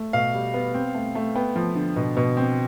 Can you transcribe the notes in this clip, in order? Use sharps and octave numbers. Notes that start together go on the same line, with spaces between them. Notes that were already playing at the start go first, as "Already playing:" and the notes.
Already playing: A3
B2 F5
G3
B3
C4
A3
A3
B3 G5
F3
D3
B2
B2
C4